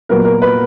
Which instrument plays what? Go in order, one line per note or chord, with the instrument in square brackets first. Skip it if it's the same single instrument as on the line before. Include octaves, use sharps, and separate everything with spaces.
[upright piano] A#2 F#3 B3 A#4
A#4
B4